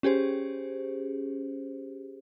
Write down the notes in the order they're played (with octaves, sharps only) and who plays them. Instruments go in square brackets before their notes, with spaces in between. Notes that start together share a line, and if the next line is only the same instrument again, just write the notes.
[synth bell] C#4 G4 G#4 C5